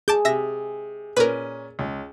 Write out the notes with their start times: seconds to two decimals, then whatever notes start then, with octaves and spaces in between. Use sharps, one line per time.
0.08 G#4 A5 D6 G6
0.25 C3 E5 A#6
1.17 A#2 C#4 A#4 B4
1.79 C#2